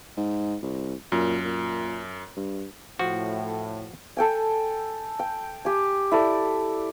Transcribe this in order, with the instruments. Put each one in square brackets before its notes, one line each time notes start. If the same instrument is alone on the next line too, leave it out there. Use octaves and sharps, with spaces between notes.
[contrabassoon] G#2
C2
[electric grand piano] F#2 [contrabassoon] A#2
[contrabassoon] A#2
G2
[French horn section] A2 [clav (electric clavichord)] F3 F#4
[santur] A4 G5 G#5
G5
G4 G#5
E4 A4 D5